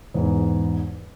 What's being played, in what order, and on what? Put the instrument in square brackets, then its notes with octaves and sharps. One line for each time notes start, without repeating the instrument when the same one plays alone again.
[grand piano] E2 G#2